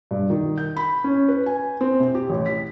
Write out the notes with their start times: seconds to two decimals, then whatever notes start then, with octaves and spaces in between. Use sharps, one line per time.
0.11 G2
0.30 D#3
0.58 G6
0.76 B5
1.04 C#4
1.28 B4
1.46 G#5
1.81 C4
2.00 C3
2.15 G4
2.30 A1
2.46 B6